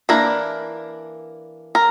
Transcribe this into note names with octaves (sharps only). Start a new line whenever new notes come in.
E3 A#3 D4 A#4
A#4